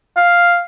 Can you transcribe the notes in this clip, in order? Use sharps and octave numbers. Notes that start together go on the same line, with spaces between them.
F5